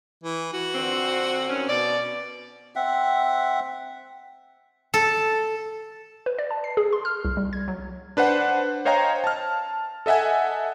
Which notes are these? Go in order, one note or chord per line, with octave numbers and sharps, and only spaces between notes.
E3
F#4
F2 D3 C4
D#3 F#3 C#4
B2 D5
C4 E5 F#5
A4
B4
D5
A5
C7
G#4
C6
F6
C2
G3
G#6
F#3
D4 B4 C5 F#5
C5 C#5 D#5 F5 G5 A#5
A5 F6
A4 D#5 E5 F#5 G#5